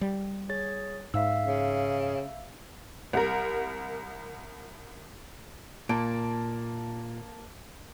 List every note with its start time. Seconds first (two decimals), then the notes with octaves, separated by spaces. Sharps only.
0.01 G3
0.49 G#4 C#5 A6
1.14 G#2 E5 F5 E6
1.43 C#3
3.13 C2 A#4
5.89 A#2 A#3 A5 D7